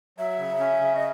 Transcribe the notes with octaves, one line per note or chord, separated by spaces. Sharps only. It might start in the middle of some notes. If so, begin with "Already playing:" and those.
F#3 E5
C#3
C#4
C#3
D#5